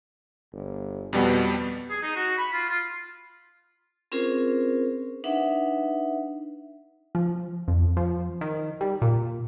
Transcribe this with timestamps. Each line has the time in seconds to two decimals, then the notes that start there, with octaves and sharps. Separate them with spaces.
0.53 G1
1.13 F2 B2 G3 B3
1.90 G#4
2.03 D#4
2.16 F#4
2.37 B5
2.53 F4
2.69 F4
4.12 C4 C#4 F4 G#4 A#4 C5
5.24 D4 D#4 B4 E5 F#5
7.15 F3
7.68 F2
7.97 F3
8.41 D#3
8.81 G3
9.02 A#2